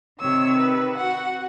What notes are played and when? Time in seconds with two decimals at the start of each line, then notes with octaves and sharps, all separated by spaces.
0.20 C3 D#3 C#5 E6
0.58 B4
0.98 F#4 F#5